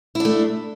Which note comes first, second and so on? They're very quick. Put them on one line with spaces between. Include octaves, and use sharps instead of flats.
E4 D4 A3